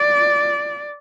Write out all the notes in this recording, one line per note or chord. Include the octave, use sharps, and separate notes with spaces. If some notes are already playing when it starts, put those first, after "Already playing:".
Already playing: D5